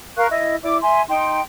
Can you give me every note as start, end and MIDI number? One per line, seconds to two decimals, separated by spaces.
0.17 0.27 70
0.17 0.27 77
0.17 0.27 85
0.17 0.27 90
0.30 0.56 64
0.30 0.56 75
0.62 0.78 64
0.62 0.78 74
0.62 0.78 86
0.82 1.02 76
0.82 1.02 80
0.82 1.02 84
1.08 1.40 63
1.08 1.40 79
1.08 1.40 84